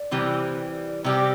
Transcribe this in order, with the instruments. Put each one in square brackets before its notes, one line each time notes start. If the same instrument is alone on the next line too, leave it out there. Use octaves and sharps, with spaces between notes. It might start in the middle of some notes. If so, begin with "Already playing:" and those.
Already playing: [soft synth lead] D5
[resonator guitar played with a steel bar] C3 E3 G3 C4
[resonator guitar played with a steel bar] C3 G3 C4 G4 [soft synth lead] D5